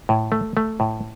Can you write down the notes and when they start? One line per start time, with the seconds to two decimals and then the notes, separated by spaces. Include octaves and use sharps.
0.09 A2
0.32 A3
0.57 A3
0.80 A2